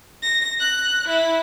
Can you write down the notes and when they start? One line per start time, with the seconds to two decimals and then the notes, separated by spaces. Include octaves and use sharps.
0.22 A#6
0.60 F#6
1.08 E4